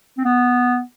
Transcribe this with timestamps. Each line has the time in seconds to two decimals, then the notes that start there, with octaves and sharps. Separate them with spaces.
0.18 C4
0.25 B3